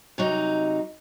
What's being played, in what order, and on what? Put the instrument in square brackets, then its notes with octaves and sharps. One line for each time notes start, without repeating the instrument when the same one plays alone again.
[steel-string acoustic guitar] C3 F#3 D#4